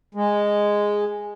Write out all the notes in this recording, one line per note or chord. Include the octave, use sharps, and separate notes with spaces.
G#3